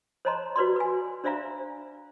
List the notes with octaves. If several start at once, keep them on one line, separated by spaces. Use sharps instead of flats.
C5 C#5 D#5 A5 A#5 C6
F#4 B4 D5 C6
B4 G#5
D4 C5 D5 E5 F5 A#5